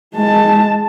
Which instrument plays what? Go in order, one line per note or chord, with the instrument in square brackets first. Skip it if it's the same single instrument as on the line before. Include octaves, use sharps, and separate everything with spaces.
[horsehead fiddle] G#3 A5